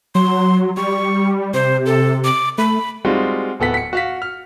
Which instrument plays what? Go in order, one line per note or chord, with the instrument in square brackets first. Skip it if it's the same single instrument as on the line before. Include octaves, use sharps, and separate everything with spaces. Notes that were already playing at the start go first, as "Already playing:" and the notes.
[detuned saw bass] F#3 [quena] C6
[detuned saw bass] G3 [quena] C#6
[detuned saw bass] C3 [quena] C5
[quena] A4
D6
[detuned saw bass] A3 [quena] B5
[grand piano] G3 G#3 C4 D#4 F4 F#4
D1 B3 A4 F#5 B6
B6 C#7
F#4 F5 B6
F6